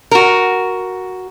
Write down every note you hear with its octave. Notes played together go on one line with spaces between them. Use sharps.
F#4 A#4